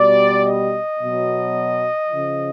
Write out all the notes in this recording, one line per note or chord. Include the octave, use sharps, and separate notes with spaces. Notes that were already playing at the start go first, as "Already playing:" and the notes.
Already playing: B2 G3 D5
D#5
B2 F#3
C#3 F3